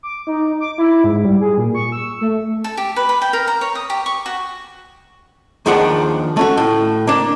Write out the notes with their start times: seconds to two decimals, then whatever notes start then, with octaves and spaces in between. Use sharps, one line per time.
0.03 D6
0.27 D#4
0.60 D6
0.78 E4
1.04 G#2
1.25 G3
1.41 G#4
1.58 A#2
1.75 C#6
1.92 E6
2.21 A3
2.64 A4
2.77 G4
2.96 B4
3.09 B5
3.22 G5
3.33 A#4
3.48 A#5
3.61 C#5
3.75 D#6
3.90 G4
4.06 C#6
4.26 F#4
5.66 D#2 D#3 F3 D4 G#4 F#5
6.37 A3 C#4 F#4
6.57 A2
7.07 A#3 D4